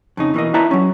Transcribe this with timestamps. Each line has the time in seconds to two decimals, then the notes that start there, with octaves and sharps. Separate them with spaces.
0.17 F2 C#3 D#4
0.34 B2 E3 A#3 D#5
0.54 E4 B4 D5 E5 A5 A#5
0.71 F#3 C#4